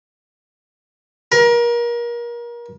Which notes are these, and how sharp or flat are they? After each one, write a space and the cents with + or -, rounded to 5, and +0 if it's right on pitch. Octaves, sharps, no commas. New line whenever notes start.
A#4 +30